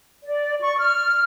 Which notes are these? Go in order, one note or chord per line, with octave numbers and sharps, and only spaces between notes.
D5
C#6
F6